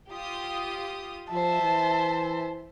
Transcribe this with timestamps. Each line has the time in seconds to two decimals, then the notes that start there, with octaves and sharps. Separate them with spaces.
0.13 F4 G4 D#6
1.32 F3 C5 E5 A5
1.62 E3